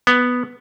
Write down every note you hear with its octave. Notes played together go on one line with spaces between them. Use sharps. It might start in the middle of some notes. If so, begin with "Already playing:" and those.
B3